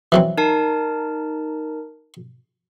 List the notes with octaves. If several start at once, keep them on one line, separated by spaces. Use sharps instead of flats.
E3 F#3 C4
D#4 A#4 A5